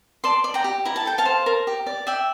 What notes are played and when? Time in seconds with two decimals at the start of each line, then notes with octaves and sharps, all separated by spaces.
0.24 D5 A5 C6
0.44 D5
0.54 G5 A#5
0.64 G4
0.85 E4 A#5
0.96 A5
1.05 A4 G5
1.18 F5 A5
1.25 C5
1.46 A#4
1.67 G4
1.86 D5
2.07 D5 E5 G5